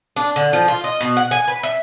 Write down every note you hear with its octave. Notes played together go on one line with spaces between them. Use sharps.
D4
D3
F3
F4
D#5
B2
F#5
G#5
B4
E5